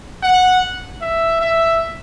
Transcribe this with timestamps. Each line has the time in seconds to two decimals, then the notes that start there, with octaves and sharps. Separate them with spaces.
0.23 F#5
1.02 E5
1.41 E5